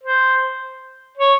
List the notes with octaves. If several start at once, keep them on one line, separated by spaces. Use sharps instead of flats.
C5
C#5